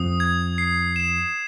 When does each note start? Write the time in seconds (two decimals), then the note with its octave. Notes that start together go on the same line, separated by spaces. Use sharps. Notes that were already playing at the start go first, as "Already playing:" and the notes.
Already playing: F2 D#6
0.20 G#6
0.58 C7
0.96 E7